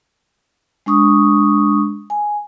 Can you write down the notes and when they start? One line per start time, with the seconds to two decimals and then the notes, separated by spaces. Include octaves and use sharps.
0.86 G#3 D4 C#6 D#6
2.10 G#5